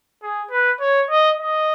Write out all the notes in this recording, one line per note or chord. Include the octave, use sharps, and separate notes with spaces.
G#4
B4
C#5
D#5
D#5